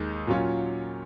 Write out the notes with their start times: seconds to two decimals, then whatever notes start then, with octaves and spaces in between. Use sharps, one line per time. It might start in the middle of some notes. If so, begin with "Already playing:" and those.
Already playing: D#2 D#3 G#3 D#4
0.27 A#2 F#3 C#4 F4